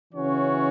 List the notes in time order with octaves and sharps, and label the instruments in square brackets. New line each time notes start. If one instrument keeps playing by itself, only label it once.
[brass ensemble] C#3 E3 C#4 F#4 C#5